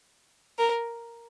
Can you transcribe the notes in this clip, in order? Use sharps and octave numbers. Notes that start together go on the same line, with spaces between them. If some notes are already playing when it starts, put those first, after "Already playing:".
A#4